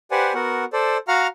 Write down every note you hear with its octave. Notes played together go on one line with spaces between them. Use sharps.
G4 B4 C5 D5 F#5 G#5
B3 F#4 A#4 F#5
A4 C5 D5
F#4 F5 F#5 A#5 F6